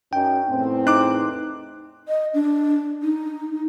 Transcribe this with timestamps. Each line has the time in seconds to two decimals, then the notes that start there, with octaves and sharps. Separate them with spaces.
0.13 F#2 C#4 D#4 G5
0.49 E2 A2 C4
0.87 D#4 D6 F#6
2.08 D#5
2.34 D4
3.03 D#4